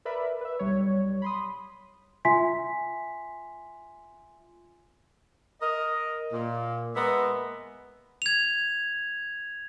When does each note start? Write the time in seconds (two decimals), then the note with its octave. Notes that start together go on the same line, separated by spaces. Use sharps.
0.05 A#4 B4 D5 E5 B5
0.41 B4 E5
0.59 B1 G3 C#5
1.22 B5 C6 D#6
2.25 F4 E5 G#5 C6 B6
5.61 A#4 D#5
6.32 A#2
6.95 G#3 A#3 B3 A#4 D#5 E5
8.22 G#6 F7